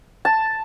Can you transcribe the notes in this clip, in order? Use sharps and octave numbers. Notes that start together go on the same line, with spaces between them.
A5